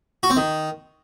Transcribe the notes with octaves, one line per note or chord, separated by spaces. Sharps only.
F#4
C4
D#3